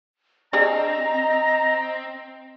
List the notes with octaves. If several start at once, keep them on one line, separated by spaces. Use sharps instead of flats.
C4 D4 G4 G#4 D#5 A#5